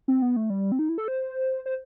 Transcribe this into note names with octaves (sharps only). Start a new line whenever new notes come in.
C4
B3
A3
G3
C4
D#4
E4
A4
C5
C5